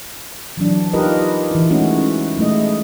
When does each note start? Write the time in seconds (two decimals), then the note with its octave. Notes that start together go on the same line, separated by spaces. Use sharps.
0.57 E3 F#3 D4
0.93 D#4 F4 G4 A#4 B4 D#5
1.51 E3 E4
1.70 G#3 A3 C#4 D#4 E4 F#4
2.38 G#3 A3 E4 D#5